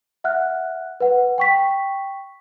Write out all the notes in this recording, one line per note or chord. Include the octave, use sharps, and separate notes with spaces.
E5 F#5 F6 F#6
B4 F#5
G5 C#6 B6